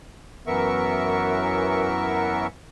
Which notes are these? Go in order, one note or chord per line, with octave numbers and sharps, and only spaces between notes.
F#2 E3 B3 A#4 E5 C#6